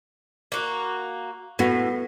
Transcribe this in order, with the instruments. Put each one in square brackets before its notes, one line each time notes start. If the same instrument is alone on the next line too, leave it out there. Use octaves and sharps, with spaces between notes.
[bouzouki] A#3 F#4
[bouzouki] A2 [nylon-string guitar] B3 F#4